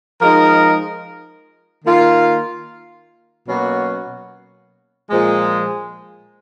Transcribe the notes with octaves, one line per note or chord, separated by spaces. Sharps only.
F3 G#3 D#4 A#4
D#3 A#3 F4
B2 F#3 A#3 C#4 F#4
A#2 F3 G#3